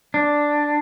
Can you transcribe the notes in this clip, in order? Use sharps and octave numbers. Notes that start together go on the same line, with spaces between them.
D4